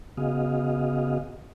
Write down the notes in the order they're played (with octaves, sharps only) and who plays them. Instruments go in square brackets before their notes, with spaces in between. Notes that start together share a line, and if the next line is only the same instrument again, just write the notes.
[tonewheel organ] C#3 B3 F#4 G#4 D#5 F5